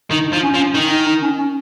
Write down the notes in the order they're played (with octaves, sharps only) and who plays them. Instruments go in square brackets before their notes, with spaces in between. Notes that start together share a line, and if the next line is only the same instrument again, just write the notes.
[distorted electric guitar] D#3 [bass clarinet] D#4
[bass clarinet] D#4
[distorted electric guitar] F3
[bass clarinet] C#4
[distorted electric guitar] F3
[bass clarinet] C#4
[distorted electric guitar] D#3 [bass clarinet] D#4
[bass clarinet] D#4
D#4
C#4
C#4